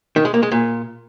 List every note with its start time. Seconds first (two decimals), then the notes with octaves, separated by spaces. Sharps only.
0.16 D#3
0.25 G#3
0.34 A#3
0.43 G#3
0.52 A#2